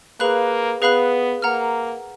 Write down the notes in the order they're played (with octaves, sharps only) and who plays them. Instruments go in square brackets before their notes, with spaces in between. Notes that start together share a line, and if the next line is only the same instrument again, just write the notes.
[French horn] A#3 [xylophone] G#4 B4 F5 B5 F#6
[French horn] B3 [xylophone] G#4 B4 F5 B5 F#6
[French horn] A#3 [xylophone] F#5 A#5 F6